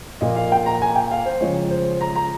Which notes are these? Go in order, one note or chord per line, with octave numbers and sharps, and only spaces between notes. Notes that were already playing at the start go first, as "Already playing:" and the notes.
A#2 F3 A#3 D#5
F5
G5
A#5
G#5
G5
F5
C5
C#3 F3 G#3 C#5
C5
A#5
A#5